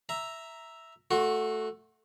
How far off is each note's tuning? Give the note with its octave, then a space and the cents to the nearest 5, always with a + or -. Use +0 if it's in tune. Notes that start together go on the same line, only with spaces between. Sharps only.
E5 +0 A#5 +0
A3 +0 F#4 +0 C6 +40